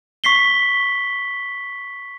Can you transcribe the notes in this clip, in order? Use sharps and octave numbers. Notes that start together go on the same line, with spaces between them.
C#6 B6 C7 G7